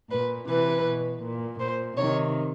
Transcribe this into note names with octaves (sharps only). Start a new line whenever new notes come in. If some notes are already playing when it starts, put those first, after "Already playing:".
A#2 B4
C3 E3 B4
B2
A#2
A#2 C5
C3 D#3 C#5